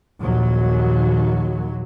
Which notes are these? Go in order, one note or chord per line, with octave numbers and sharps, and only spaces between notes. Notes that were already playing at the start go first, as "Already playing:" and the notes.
A#1 D#2 F#3